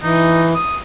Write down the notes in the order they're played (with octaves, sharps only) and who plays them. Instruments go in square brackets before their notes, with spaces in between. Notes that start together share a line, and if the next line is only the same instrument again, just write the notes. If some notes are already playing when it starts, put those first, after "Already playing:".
[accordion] E3 [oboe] D#4
[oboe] D#6